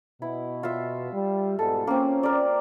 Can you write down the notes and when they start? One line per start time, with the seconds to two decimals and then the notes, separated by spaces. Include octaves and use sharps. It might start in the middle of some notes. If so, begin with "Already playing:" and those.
0.22 B2 E4
0.63 F4 E5
1.13 G3
1.59 G#2 B2 G3 A4
1.87 A#3 C4 C#4
2.23 A#4 D5